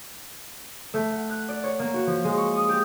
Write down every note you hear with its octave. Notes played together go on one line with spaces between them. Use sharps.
A3
F#5
F#6
D5
C#5
A#3
F#4
F3
G#3
C#6
D#6
G4